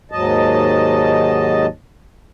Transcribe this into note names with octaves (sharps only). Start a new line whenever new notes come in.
D#2 G#2 F#3 D#5 A5